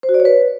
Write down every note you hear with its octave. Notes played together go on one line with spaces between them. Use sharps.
C5
F#4
D5
C#5
B4